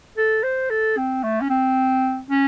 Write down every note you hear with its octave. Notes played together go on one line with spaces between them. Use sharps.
A4
C5
A4
C4
A3
C#4
C4
C#4